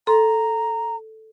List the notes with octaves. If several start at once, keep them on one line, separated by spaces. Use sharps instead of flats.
A4 A#5 C6